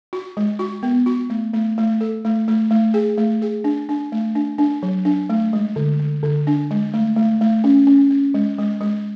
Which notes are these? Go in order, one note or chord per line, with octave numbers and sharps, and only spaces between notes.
F#4
G#3
F#4
B3
F#4
A3
A3
A3
A4
A3
A3
A3
G#4
A3
G#4
D4
D4
A3
D4
D4
F#3
D4
A3
G#3
D3
D3
D3
D4
G#3
A3
A3
A3
C#4
C#4
C#4
G#3
G#3
G#3